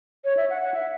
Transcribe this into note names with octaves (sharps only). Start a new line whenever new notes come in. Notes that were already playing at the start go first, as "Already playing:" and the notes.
C#5
E5
F#5
F#5
E5